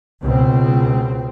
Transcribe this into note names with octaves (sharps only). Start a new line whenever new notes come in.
C#2 B2 C4